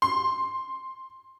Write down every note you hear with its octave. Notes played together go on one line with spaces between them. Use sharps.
C6